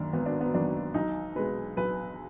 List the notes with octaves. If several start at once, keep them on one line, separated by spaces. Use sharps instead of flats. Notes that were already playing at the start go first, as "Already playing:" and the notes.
Already playing: G#1 F#2 D#3 F#3 A#3 D4
G#1 B3
D4
B3
F#2 D#3 F#3 A#3 D4
B1 D#4
B2 G#3 B4
B1 B4